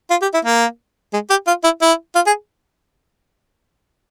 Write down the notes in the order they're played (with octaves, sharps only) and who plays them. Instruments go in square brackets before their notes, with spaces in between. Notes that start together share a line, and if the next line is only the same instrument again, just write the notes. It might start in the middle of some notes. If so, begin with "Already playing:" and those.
[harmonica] F4
G4
E4
A#3
G#3
G4
F4
E4
E4
F4
G#4